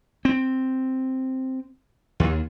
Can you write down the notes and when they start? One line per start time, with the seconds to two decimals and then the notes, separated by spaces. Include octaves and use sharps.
0.25 C4
2.20 D#2